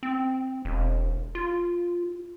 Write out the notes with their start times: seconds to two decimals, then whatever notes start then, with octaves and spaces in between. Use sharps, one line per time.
0.03 C4
0.65 E1
1.35 F4